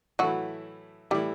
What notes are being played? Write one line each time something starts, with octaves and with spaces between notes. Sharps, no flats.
A2 E3 F#3 A3 E4 F#4
A2 E3 G3 A3 E4 G4